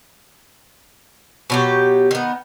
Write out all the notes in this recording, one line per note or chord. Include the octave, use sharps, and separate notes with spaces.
B2 F#3 G4
D#3 B3